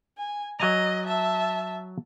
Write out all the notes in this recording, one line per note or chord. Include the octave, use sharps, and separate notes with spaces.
G#5
F#3 D#5 G#5 A#5
E5 A5